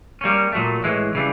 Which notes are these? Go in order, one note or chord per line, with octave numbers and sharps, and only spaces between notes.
G3 A#3 C#4
A#2 F#3 A3
A2 E3 G#3
C#3 E3 G3